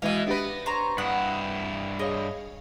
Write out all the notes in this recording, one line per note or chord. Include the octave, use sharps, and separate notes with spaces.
B2 E3 G#3 D#5 F5 D#6
B3 D4 G4 B4 A#6
C5 C#5 A#5
G2 E4 F#5 D#6
G#4 C#5 D#5 F5